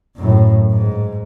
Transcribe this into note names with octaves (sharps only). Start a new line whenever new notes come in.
F#2 A2
G#2